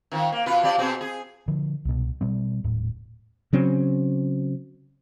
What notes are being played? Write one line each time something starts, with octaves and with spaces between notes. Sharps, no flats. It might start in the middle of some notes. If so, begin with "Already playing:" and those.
D#3 F3
A#3
B2 F4 B4
F3 G4 D5
B2 C4 G#4
G#4
D3 F3
C2 B2
B2 G3 C4
D#1 A2
C#3 F#3 C4 C#4